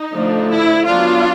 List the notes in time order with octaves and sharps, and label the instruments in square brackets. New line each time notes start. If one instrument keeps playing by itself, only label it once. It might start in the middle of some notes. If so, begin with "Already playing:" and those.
Already playing: [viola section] D#4
D3 F3 A3 D4
E4
F#3 B3 D4 F4